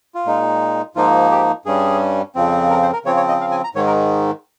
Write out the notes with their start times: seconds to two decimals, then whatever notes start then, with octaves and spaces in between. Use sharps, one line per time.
0.15 F4
0.26 A#2 G#3 D#4
0.95 G#2 F3 A#3 D#4 F4
1.31 G4
1.66 G2 G3 C#4 G#4
2.35 F2 C#3 F3 C4
2.70 A#4
2.82 C5
2.93 A#4
3.05 C#3 F3 C4 C#5
3.17 C#5
3.29 D#5
3.41 F5
3.51 G#5
3.64 A#5
3.75 G#2 D#3 G#3 C#5
3.87 A#4